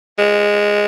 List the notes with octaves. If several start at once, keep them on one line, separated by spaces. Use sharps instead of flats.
G#3